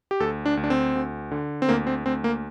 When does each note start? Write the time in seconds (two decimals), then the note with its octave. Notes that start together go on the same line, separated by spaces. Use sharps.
0.11 G4
0.20 D2 A4
0.46 D4
0.57 D2
0.64 D4
0.70 C4
0.95 D2
1.31 D3
1.62 C4
1.69 D2 A#3
1.87 C4
2.05 D2 C4
2.24 A#3